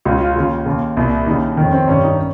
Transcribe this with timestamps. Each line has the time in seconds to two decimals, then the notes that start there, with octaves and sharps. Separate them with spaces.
0.05 C#2 C#3 F4
0.21 F4
0.36 D#2 C#3 F4
0.66 D#2 C#3
0.97 C2 A#2
1.27 D#2 C#3 D#4
1.57 F2 D#3 C#4
1.73 C4
1.88 G2 D#3 C#4
2.03 D#4
2.19 C#4